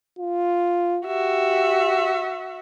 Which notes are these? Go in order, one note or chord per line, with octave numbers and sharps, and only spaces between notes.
F4
F#4 G4 E5